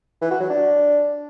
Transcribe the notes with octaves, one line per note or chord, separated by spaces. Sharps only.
E3
F#4
F#3
D4